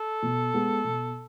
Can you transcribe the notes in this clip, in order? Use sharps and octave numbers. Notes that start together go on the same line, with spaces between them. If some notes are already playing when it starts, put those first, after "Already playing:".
Already playing: A4
B2
G#3 B3
B2